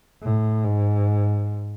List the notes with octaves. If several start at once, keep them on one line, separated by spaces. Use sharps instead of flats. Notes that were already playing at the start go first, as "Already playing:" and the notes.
A2
G#2